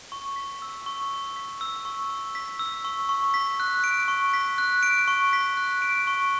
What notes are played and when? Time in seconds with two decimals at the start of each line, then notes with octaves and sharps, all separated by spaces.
0.12 C#6
0.36 B6
0.62 E6
0.86 C#6
1.11 C#6
1.36 B6
1.61 E6
1.85 C#6
2.10 C#6
2.35 B6
2.59 E6
2.85 C#6
3.09 C#6
3.34 B6
3.60 F#6
3.84 D7
4.08 C#6
4.34 B6
4.58 F#6
4.83 D7
5.08 C#6
5.33 B6
5.57 F#6
5.82 D7
6.07 C#6